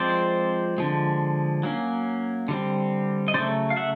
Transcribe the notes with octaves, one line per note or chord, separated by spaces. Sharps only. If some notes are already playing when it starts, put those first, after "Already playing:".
Already playing: F3 G#3 C4 C5 D5
D3 F3 G#3
F#3 A#3 C#4
D3 G3 C4
D#5
C#3 F#3 A3 C5 D5
F5
E5 F#5